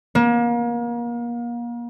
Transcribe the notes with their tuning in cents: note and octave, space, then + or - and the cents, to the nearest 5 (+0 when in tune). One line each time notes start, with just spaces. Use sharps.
A#3 +35